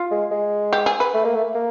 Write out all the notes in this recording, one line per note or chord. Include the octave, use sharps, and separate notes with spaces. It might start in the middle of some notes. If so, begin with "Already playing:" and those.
Already playing: F4
G#3
G#3
G4
G#4
B4
A3
A#3
A3
A#3